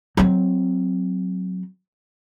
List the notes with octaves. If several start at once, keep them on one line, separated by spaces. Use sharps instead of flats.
F#3 C4